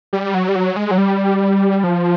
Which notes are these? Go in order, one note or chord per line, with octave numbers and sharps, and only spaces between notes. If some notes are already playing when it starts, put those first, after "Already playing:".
G3
F#3
G3
F#3
G#3
F#3
G3
F3